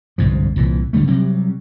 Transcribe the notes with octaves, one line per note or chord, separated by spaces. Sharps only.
G1 C2 G#2 F3
C2 A#2 E3
F#1 D3 G3 A3
C3 F#3 G3